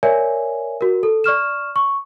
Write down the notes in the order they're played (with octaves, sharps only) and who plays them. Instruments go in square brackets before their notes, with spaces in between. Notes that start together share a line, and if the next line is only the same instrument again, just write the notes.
[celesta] A#4 C#5 D5 E5 G#5
F#4 A#4
A4
D5 C#6 F6 E7
C#6